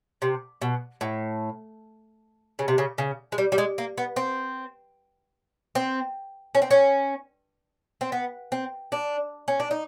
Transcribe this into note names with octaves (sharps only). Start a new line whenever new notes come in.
C3
B2
A2
C#3
C3
C#3
C#3
G#3
G3
G3
G#3
A#3
B3
C4
C4
C#4
C4
C#4
C4
B3
C4
D4
C#4
D4
D#4